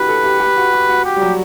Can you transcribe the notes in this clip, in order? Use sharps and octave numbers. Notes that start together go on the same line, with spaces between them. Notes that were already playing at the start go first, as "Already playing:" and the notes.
Already playing: D4 E4 F#4 G4 B4
A4
G4
G4
F#4
G4
F#4
G4
G3
F#3